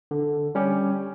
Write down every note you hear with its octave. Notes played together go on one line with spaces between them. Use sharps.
D3
G3 C#4 G4